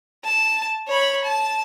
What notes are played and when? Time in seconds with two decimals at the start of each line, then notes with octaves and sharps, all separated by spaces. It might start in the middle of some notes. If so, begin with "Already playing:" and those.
0.24 A5
0.88 C#5 B5
1.24 A5